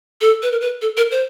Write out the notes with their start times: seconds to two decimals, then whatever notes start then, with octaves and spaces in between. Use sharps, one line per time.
0.21 A4
0.43 B4
0.52 A#4
0.61 B4
0.82 A4
0.97 A#4
1.11 C5